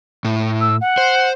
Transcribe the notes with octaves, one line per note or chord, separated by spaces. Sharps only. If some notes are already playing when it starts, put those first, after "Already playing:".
A2
E6
F#5
C5